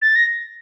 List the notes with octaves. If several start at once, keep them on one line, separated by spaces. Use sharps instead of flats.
A6
A#6